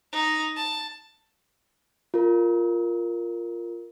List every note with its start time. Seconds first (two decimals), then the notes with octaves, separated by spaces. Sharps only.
0.13 D#4
0.57 A5
2.14 F4 A#4